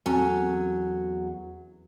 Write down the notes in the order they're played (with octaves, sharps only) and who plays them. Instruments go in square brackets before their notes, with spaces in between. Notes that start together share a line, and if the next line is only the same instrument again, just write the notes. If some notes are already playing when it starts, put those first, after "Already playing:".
[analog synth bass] E2 [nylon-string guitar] F#3 [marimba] C4 [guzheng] C#4 A4